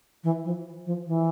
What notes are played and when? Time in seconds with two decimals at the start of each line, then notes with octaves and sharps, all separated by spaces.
0.24 E3
0.45 F3
0.86 F3
1.07 E3